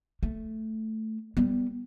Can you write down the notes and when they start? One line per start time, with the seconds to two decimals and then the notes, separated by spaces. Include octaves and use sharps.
0.23 A3
1.37 G3 B3